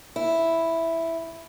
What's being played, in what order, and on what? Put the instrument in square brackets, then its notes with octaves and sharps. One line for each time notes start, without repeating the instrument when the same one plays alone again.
[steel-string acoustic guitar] E4